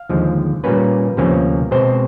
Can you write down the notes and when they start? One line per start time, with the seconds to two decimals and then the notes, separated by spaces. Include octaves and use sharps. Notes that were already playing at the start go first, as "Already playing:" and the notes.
Already playing: F5
0.09 D#2 D3 F3 G#3
0.64 A#2 G3 A#3 C#4 B4
1.17 D2 C3 F3 A#3 C#4
1.71 B2 G#3 C4 C5